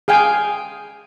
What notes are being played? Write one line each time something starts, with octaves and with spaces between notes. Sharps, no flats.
G#4 F5 G5 G#5